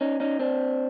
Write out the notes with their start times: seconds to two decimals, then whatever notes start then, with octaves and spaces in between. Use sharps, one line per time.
0.01 C#4 D#4
0.20 C#4 D#4
0.39 C4 D4